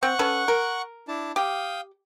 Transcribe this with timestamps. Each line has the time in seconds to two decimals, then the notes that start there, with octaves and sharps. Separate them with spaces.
0.03 C4 F#5 C#6 F#6
0.19 C#4 A4 B4
0.48 A#4
1.08 D4 E4 A5
1.36 G4 F5 G5 D#6